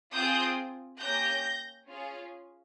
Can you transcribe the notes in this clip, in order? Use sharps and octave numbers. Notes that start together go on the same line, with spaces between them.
C4 F4 G#4 D#6 G6
A#3 C#4 G4 G6 A#6
C#4 F4 G#4